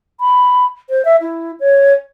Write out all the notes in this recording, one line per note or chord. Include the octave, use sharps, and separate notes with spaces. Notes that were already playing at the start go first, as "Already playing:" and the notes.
B5
C5
E5
E4
C#5